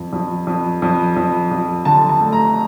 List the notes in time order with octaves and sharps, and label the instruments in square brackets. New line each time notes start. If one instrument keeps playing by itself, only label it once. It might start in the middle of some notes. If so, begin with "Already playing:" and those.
Already playing: [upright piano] F2
F2
F2
F2
F2
F2
D3 A5
A5
A3
A#5